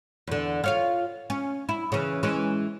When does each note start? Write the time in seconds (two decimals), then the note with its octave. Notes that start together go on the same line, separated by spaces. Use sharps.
0.27 E2 D3
0.64 F4 C#5 F5
1.30 C#4
1.69 E4
1.92 C#3 E3
2.23 E3 G#3 C#4